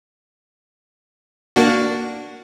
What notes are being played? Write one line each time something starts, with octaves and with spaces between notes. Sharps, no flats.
A#3 D4 F#4